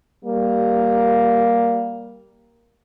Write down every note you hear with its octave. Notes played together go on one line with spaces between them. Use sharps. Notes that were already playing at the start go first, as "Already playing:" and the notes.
G3 A#3